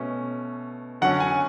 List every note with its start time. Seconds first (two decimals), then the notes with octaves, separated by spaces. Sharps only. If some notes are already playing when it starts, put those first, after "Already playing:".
Already playing: B2 A3 C#4
1.01 D3 F#3 C#4 F#5
1.20 G#5